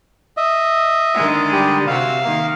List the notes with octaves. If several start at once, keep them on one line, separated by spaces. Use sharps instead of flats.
D#5 E5
D3 D#3 G#3
G3 G4
C3 F#4 F5 E6
D#3 A#3